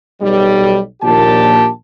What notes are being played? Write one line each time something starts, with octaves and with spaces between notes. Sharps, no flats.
B1 G3
A#1 D#2 A#2 G4 A5